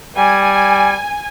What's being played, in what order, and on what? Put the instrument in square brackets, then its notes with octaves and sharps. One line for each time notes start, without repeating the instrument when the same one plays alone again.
[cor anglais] G3 [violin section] G#5